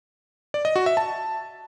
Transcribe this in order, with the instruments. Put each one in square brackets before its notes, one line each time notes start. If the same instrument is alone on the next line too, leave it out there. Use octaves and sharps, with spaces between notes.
[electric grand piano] D5
D#5
F#4
E5
A5